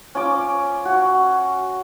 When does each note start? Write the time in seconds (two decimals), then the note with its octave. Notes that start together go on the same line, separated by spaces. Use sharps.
0.15 C#4 F4 D6
0.85 F#4